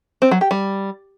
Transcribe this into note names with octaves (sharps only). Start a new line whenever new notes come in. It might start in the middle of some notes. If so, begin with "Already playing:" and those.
C4
F#3
G4
G3